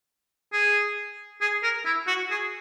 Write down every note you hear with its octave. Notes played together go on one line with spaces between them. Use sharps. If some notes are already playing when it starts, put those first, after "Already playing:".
G#4
G#4
A#4
E4
F#4
G#4